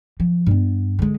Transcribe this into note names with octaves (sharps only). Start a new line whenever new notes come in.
F3
G2 B3
D3 G#3